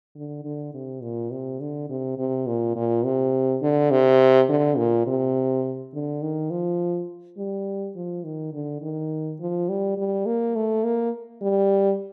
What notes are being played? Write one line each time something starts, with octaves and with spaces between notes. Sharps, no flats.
D3
D3
C3
A#2
C3
D3
C3
C3
A#2
A#2
C3
D3
C3
D3
A#2
C3
D3
D#3
F3
G3
F3
D#3
D3
D#3
F3
G3
G3
A#3
A3
A#3
G3